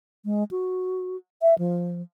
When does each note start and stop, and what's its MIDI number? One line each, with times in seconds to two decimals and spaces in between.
0.25 0.44 56
0.51 1.16 66
1.42 1.54 76
1.58 2.02 53